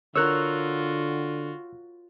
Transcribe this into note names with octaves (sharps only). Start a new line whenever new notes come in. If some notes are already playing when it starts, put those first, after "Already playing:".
D3 F4 F#4 A#4 C#5 E6 F#6